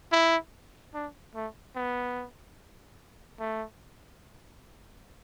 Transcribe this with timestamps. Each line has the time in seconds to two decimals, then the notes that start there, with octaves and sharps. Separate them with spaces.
0.12 E4
0.94 D4
1.35 A3
1.76 B3
3.40 A3